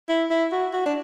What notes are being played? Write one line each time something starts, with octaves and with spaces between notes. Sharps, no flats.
E4
E4
F#4
F#4
D4